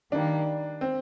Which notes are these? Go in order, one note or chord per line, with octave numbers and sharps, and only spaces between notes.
D#3 G3 A#3 D4
C4